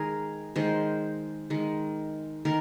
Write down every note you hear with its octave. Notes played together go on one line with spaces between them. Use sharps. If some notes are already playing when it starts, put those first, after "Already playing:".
Already playing: D#3 G#3 G#4 A#4
D#3 G#3 C5
D#3 G#3
D#3 A#4